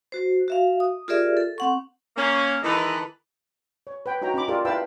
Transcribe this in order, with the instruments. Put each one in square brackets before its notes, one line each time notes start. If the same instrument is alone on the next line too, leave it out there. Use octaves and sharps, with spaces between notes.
[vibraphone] F#4 C5
F#4 E5 F5
D#6
F4 G4 G#4 A#4 D5 E5
A4
C4 F#5 C#6
[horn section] A#3 C#4
D#3 E3 G#3 D#4 A4 B4
[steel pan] C#5
B4 G5
D#4 F#4 C#5 G5 A#5
C#4 D#4 A#5 B5 D6
F4 G4 A4 A#4 D5
E4 B4 F5 G5 A5 E6